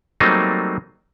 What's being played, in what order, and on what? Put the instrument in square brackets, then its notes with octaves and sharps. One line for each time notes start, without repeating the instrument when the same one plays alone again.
[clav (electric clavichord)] F#3 G3 A3 A#3 C4 D#4